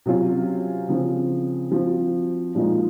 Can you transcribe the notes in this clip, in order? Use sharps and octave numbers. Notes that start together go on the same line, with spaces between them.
C3 F#3 C#4 F4
C#3 F3 C4
F3 C4 F#4
A#2 F3 G#3 D#4